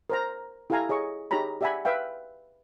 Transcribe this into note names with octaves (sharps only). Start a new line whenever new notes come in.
A#4 C5 A#5
E4 G4 A4 F5 G#5 A#5
G#4 C#5 D#5 C#6
D#4 G4 G#4 C#5 A#5 B5
G4 D5 E5 F#5 G#5 B5
B4 E5 F5 G5